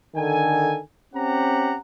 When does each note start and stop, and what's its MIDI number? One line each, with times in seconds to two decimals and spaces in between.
0.16 0.80 50
0.16 0.80 51
0.16 0.80 69
0.16 0.80 80
1.15 1.77 60
1.15 1.77 61
1.15 1.77 67
1.15 1.77 78
1.15 1.77 82